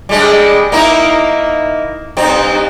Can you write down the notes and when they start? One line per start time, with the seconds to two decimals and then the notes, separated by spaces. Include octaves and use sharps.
0.09 G3 G#3 D4
0.72 A#3 D#4 E4
2.17 G2 C4 D#4